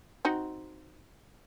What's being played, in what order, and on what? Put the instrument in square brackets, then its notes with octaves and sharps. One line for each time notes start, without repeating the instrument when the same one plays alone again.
[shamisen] C4 D#4 F#4